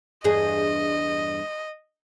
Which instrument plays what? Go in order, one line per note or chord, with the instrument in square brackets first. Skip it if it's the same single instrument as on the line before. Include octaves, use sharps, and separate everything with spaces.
[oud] E2 G2 G#4 [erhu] D#5